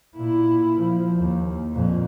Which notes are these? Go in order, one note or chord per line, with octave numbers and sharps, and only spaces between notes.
A#2 E4
F3
D#2
F2 A#2